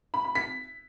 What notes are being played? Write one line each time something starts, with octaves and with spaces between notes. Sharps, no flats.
B5
B5
B6